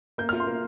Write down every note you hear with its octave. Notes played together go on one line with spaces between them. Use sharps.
A#3 G6
F6
F4
C6
A#3